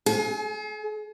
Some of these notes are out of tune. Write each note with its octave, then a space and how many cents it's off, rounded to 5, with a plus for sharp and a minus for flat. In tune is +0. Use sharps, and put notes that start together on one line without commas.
G#4 +45 G#5 +15